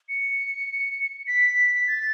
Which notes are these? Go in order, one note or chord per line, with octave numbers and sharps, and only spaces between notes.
C#7
B6
A6